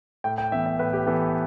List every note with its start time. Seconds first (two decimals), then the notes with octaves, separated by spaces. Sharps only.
0.24 A2 G5
0.38 G5
0.52 E3 B3 E5
0.66 E5
0.79 A2 B4
0.93 G4
1.07 E3 B3 A4